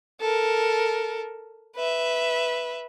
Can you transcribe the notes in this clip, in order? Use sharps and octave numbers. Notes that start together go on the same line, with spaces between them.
A4 A#4
B4 E5